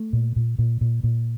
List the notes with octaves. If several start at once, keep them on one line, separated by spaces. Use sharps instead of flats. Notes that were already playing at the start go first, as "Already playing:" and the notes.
Already playing: A3
A#2
A#2
A#2
A#2
A#2